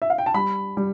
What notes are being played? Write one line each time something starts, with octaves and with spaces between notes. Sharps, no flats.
E5
F5
G5
A5
G3 B5
G3